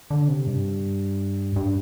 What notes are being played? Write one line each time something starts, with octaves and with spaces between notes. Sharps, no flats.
D3
C3
G2
G2